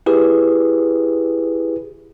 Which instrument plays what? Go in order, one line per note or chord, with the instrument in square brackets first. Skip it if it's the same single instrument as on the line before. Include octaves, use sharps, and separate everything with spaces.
[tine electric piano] E4 G4 G#4 B4